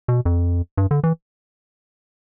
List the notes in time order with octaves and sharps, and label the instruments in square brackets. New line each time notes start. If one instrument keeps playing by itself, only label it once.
[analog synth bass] B2
F2
G2
D3
E3